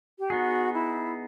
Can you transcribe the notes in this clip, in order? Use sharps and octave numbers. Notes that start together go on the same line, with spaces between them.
G4
B3 D#4 F#4 G#4
E4